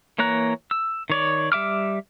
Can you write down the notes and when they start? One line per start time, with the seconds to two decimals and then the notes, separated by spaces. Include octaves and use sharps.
0.18 E3 A#3 C#5 A#5 F#6
0.71 E6
1.10 D#3 C#5 D5
1.52 G3 E5 D6 F6